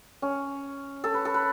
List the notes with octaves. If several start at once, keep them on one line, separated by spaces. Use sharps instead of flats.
C#4
A4
B4
A4
B4